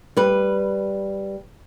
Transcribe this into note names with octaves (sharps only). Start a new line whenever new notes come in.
G3 B4